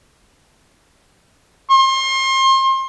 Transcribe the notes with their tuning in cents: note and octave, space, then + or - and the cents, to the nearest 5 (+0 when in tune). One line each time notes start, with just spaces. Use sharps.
C6 +35